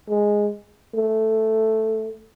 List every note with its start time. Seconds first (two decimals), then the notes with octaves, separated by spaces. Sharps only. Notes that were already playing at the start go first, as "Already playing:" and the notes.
0.10 G#3
0.94 A3